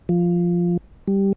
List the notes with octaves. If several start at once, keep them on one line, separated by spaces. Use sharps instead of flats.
F3
G3